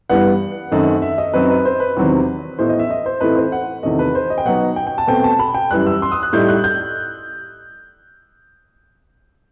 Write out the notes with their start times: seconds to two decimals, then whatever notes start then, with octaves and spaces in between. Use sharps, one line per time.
0.10 G2 E3 G3 B3 F#5
0.71 F#2 D#3 A3 C4 D#4
1.02 E5
1.18 D#5
1.34 F#2 F#3 C4 D#4 B4
1.50 B4
1.65 C5
1.80 B4
1.97 E2 C3 D#3 F#3 C4
2.59 A2 E3 B3 D#4 C5
2.69 D#5
2.79 E5
2.90 D#5
3.06 C5
3.20 A2 E3 A3 C4 D#4 B4
3.37 C5
3.52 F#5
3.83 E2 C3 D#3 A3 D#5
3.99 B4
4.15 C5
4.30 D#5
4.38 G5
4.45 B2 F#3 B3 D#4 F#5
4.76 G5
4.87 G5
4.98 A5
5.07 B2 A3 C4 G5
5.24 A5
5.39 B5
5.54 G5
5.71 F#2 E3 G3 F#6
5.87 E6
6.02 C6
6.12 D#6
6.23 F#6
6.33 A2 G3 D#4 G6
6.48 F#6
6.64 G6